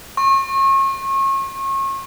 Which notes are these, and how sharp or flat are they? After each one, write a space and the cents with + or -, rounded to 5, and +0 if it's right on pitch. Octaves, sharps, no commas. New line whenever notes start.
C#6 -35